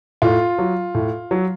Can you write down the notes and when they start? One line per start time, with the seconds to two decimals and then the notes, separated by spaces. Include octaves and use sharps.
0.22 A2 F4
0.59 F#3
0.95 A2
1.31 F#3